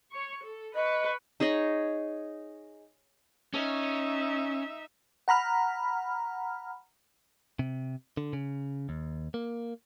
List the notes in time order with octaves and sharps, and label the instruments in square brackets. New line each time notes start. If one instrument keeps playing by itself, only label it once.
[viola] C#5 C#6
A4
[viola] B4 C#6 [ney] D#5
[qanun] D#4 G#4 C#5 D#5
[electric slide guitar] C#4 [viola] D#4 E5
[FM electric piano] F#5 A#5 B5 F6
[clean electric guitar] C3
D3
C#3
D#2
A#3